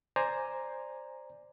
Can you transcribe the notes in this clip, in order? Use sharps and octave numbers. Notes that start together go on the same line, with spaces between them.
C5 D5 G#5 A#5